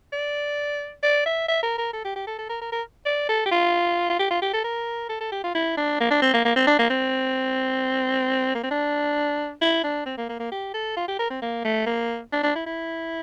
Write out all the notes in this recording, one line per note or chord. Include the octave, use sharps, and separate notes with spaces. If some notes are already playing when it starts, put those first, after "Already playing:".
D5
D5
E5
E5
A#4
A#4
A4
G4
G4
A4
A4
A#4
A#4
A#4
D5
A4
G4
F4
F4
G4
F4
G4
A4
A#4
A4
A4
G4
F4
E4
D4
A#3
D4
C4
A#3
A#3
C4
D4
A#3
C4
A#3
C4
D4
E4
D4
C4
A#3
A#3
A#3
G4
A4
F4
G4
A#4
C4
A#3
A3
A#3
D4
D4
E4
E4